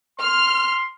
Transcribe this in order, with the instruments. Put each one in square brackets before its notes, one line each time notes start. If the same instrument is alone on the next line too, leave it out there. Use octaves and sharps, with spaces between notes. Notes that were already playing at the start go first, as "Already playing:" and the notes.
[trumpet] C6 [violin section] F6